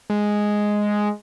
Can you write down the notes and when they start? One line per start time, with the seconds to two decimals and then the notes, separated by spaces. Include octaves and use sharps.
0.10 G#3